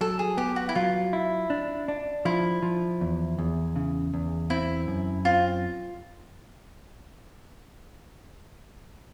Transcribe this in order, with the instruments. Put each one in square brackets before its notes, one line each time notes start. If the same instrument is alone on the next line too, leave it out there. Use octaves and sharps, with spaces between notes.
[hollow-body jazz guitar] F#3 [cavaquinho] A4
[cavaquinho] G#4
[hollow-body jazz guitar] B3 [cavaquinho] G4
[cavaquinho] F#4
E4
[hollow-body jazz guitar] F#3 [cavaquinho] F4
[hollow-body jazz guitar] E4
D4
D4
[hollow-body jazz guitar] F3 [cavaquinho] E4
[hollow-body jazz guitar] F3
E2
E2
C#3
E2
[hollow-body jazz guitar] C4 [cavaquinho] E4
[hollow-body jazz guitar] F#2
[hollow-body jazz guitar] C4 [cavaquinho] F4